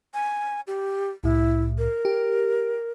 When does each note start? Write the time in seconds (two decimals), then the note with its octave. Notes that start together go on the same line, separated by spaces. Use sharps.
0.14 G#5
0.67 G4
1.24 C2 A2 E4
1.78 A#4
2.05 G4